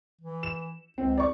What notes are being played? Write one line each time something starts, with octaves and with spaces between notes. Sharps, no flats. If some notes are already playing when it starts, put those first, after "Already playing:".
E3
E7
C#2 C4
D5 C#6